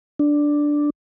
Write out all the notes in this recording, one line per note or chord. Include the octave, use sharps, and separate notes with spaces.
D4